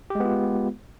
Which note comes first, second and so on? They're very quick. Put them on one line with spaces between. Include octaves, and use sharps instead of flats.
G4 G#3 B3 F4